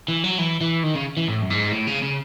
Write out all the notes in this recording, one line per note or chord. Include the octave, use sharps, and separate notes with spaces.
E3
F#3
E3
E3
D#3
C#3
E3
A2
F#2
G#2
A2
C#3
C#3